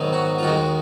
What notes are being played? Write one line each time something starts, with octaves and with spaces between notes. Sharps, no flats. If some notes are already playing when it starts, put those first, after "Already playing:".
Already playing: G#2 D#3 F#3 B3
F#4
F4
D#2 D#3 G#3 F#4